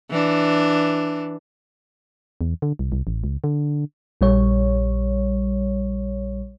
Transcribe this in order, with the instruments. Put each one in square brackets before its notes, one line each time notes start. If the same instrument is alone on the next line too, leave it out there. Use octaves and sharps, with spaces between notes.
[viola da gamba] E3 D4
[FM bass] E2
D3
C2
C2
A1
C#2
D3
[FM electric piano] A#1 G3 C#5